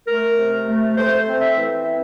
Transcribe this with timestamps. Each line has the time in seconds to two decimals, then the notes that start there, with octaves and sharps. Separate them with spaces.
0.07 A3 A#4
0.38 C3
0.68 A3
0.97 A3 C5
1.27 C4
1.42 E5
1.57 E3
1.87 C4